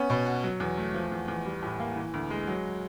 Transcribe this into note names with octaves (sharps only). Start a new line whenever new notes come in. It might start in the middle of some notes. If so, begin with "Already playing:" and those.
Already playing: B3 C#4
B2
F#4
F#3
E2
A3
F3
E2
E2
G3
A2
A#3
E3
D2
G#3
F#3